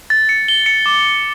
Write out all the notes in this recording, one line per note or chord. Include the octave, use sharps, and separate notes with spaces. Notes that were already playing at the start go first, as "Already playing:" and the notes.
A6
C#7
G7
C#7
D6